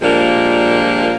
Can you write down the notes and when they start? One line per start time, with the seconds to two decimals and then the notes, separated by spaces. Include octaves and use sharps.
0.01 A#2 F3 G3 G#3 A#3 D4